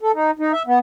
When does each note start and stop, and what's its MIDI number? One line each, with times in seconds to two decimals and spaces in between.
0.01 0.12 69
0.14 0.31 63
0.39 0.52 63
0.53 0.63 76
0.67 0.79 59